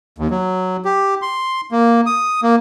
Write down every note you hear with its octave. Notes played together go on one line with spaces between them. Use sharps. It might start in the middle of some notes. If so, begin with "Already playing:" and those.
D#2
F#3
G4
C6
A#3
D#6
A#3